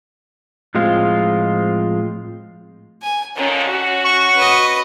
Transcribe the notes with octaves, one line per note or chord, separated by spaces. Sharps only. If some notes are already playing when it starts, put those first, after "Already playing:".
A2 F3 G#3 C4 F4
G#5
A#2 D3 D#3 C#4
F#4
C#6
B4 D#5